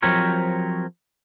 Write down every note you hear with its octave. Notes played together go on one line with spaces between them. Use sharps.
F3 F#3 C4 G4 A#4 C#5